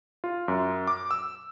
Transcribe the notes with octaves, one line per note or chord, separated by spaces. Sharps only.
F4
F#2
D6
E6